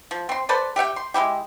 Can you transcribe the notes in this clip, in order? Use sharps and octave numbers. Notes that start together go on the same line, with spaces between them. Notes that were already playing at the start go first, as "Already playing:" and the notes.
F3
C4 C6
A4 B4 C5 D5
G4 E5 F#5 G5
C6
G#3 C#4 E4 G4